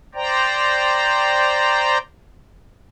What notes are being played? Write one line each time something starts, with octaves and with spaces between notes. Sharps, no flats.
C5 D5 G5 A#5